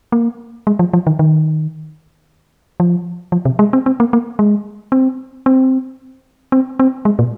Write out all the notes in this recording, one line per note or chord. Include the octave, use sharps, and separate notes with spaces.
A#3
G#3
F3
F3
D#3
D#3
F3
F3
C3
G#3
C4
C4
A#3
A#3
G#3
C4
C4
C4
C4
G#3
A#2